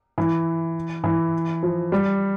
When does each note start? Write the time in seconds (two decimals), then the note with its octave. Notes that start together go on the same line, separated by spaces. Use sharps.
0.18 E3
1.04 E3
1.63 F3
1.92 G3